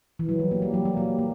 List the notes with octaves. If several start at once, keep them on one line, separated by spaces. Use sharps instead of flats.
E3
F#3
G3
A#3
G3
F#3
A#3
G3
A#3